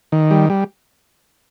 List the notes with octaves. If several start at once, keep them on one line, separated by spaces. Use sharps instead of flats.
D#3
G3
G3